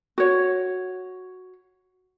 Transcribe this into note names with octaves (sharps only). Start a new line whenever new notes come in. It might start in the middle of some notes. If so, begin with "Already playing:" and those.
F#4 C#5